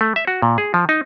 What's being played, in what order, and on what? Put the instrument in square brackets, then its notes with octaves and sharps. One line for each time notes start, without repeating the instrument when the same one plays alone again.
[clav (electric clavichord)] A3
E5
F#4
A#2
G#4
F3
D#4